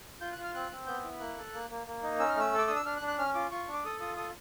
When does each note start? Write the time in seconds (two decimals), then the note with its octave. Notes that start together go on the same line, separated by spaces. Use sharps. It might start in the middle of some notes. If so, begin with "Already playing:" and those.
0.21 F4 G6
0.33 F#6
0.38 F4
0.44 F6
0.54 C4 F#6
0.71 C4
0.87 B3 G6
1.03 E4
1.20 A#3 F#6
1.37 A4
1.53 A#3
1.70 A#3
1.87 A#3
2.03 D#4
2.19 C#4 E6
2.29 F6
2.35 A3 E6
2.53 A4
2.58 D6
2.67 D4 D#6
2.76 E6
2.85 D4 F6
2.97 F#6
3.02 D4
3.08 F#6
3.18 C#4 F6
3.35 F4 D6
3.51 F4 C#6
3.68 D4
3.73 D6
3.84 A4 D#6
4.00 F4 D#6
4.17 A4 D#6